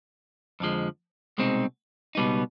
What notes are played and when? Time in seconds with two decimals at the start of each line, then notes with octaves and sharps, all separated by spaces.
0.60 F2 D3 F3 G#3
1.38 C2 B2 G#3 C4 D#4
2.15 C#2 B2 G3 B3 D#4